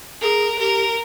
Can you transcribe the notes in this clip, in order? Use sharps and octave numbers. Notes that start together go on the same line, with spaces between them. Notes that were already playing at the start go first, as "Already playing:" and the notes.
G#4 A#4
G4 A#4